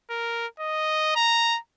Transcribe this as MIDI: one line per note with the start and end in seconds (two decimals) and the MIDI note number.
0.11 0.47 70
0.60 1.15 75
1.16 1.59 82